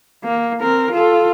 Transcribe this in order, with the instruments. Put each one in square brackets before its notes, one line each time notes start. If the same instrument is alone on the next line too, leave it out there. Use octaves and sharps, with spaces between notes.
[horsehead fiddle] A#3
C4 A#4
F4 A4